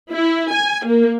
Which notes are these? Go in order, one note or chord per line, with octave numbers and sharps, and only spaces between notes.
E4
G#5
A#3